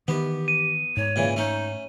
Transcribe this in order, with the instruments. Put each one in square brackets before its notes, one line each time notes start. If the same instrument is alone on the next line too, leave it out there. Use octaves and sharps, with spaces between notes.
[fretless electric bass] D#3 E3 [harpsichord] B3 [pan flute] G4
[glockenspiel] D#7
[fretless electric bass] G#2 [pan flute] C#5
[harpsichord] A#2 C#3 E3
[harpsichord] A3 C#4 [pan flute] D#4